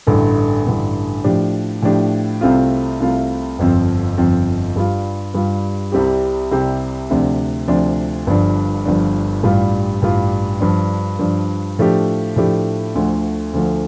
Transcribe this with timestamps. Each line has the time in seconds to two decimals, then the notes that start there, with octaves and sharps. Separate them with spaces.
0.07 A1 G2 D3 A3
0.66 A1 G2 D3 A3
1.24 A2 F3 D4 G4
1.82 A2 F3 D4 G4
2.41 C2 C3 A3 C4 F4
3.00 C2 C3 A3 C4 F4
3.59 G1 F2 F3 C4
4.17 G1 F2 F3 C4
4.76 G2 G3 F4
5.34 G2 G3 F4
5.92 C2 C3 G3 C4 G4
6.51 C2 C3 G3 C4 G4
7.10 D2 C3 F3 D4
7.68 D2 C3 F3 D4
8.27 G1 G2 F3 D4
8.85 G1 G2 F3 D4
9.43 A1 G2 G3 F4
10.02 A1 G2 G3 F4
10.60 G2 F3 D4
11.19 G2 F3 D4
11.78 A2 F3 A3 D4 G4
12.36 A2 F3 A3 D4 G4
12.95 D2 D3 F3 A3
13.53 D2 D3 F3 A3